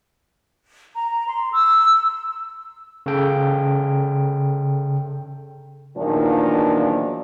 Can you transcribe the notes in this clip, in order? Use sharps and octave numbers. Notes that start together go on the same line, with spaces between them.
A#5
C6
E6
C#3 A4 G5
E2 A#2 D#3 F3 F#3 D4